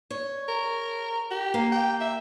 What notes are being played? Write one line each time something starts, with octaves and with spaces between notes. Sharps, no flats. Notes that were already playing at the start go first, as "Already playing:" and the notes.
C#5
A#4
G4
A#3
G5
E5